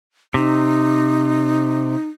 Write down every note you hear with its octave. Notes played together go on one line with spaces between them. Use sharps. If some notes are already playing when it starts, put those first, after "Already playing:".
C3 D#4